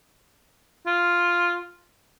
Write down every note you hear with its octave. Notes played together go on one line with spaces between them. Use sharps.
F4